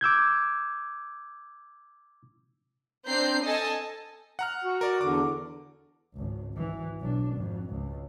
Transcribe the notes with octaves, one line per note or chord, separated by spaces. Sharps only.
D6 E6 G6 G#6
C4 D4 A#5 G6 C7
A4 D#5 G#5 A5
F#5 A#5 F6
F#4
A#4 D5
E2 D3 D6
G#1 C#2
G#1 E3
B1 D4
G#1 F2
C#2